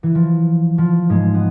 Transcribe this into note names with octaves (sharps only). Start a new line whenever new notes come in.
E3
F3
F3
G#2 G#3
B3